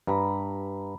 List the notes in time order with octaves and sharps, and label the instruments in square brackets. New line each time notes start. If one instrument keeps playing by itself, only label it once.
[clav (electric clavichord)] G2 [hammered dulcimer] A#5 B5